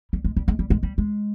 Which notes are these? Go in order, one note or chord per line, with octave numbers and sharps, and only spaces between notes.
G3
G#3
G3
G#3
G3
G#3
G3
G#3